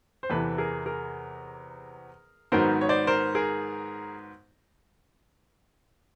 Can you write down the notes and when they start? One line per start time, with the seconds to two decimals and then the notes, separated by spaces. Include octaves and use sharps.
0.23 C5
0.30 E2 C3 E3 A4 B4
0.58 G#4 A#4
0.86 G#4 A#4
2.52 G#2 D#3 F#3 B3 D#4 A#4 C5
2.81 C#5
2.89 C5 D5
3.07 A#4 C5
3.35 G#4 A#4